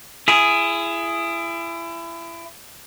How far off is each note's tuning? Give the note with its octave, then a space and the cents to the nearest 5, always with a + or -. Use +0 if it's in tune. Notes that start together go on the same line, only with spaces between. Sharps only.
E4 +30 G#4 +0